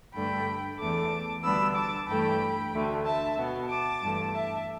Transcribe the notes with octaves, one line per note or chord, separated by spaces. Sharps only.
G2 D3 A3 G5 B5
E2 E3 A3 A5 D6
D2 D3 G3 B3 B5 E6
A5 D6
G2 E3 A3 G5 B5
D2 D3 A3
E5 A5
B2 B3
A5 D6
G2 E3 A3
E5 A5